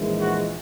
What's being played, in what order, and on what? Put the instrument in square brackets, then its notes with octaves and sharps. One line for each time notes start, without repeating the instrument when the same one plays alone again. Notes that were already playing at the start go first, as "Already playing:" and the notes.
Already playing: [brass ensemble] A#1 G#2 E3 G#3
F#4